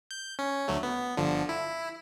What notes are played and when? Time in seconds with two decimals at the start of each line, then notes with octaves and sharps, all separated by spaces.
0.11 G6
0.39 C#4
0.68 D2 F#3 A3
0.83 B3
1.17 G1 D3 F3
1.49 E4